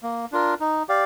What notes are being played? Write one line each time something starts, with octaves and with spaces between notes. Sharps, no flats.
A#3
D4 F4 A#4
D#4
G4 D5 F5